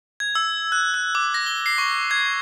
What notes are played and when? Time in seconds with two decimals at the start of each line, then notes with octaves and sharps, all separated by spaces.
0.20 G#6
0.35 E6
0.72 F#6
0.94 F#6
1.15 D6
1.34 A#6
1.46 G7
1.66 C7
1.78 C#6
2.11 G#6